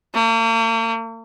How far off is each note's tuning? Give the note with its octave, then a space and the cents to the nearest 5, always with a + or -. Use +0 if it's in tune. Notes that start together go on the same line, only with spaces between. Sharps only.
A#3 -45